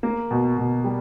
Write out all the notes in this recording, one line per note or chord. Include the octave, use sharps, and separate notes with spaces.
A#3
B2
B2
G3